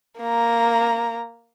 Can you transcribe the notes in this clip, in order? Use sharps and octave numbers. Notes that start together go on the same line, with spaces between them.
A#3 A#5